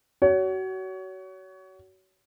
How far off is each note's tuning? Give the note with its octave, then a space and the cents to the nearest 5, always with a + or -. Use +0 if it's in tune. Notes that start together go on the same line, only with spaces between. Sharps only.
F#4 +30 C#5 +30